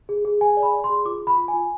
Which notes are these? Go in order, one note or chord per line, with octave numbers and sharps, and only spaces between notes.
G#4
G#4
G#4 G#5
D5
B5
D5
C6
G#4
F4 D6
F4
B5
F4
G#5
F4